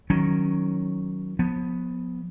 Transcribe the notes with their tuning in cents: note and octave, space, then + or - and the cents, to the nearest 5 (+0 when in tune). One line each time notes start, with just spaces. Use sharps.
D#3 +0 F#3 +0 C#4 +0
F3 +35 B3 +0